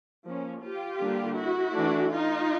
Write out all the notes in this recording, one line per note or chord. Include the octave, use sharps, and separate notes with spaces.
F3 A#3 C#4
F4 G4
D3 G3 A#3 D4
E4 F#4
E3 A3 D4
D#4 F4